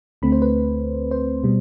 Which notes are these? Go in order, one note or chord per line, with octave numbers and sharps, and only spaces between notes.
D2 D3 A3 C4 B5
C5
B4
C5
B2 G3